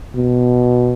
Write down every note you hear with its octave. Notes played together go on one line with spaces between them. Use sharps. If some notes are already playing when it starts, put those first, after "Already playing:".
B2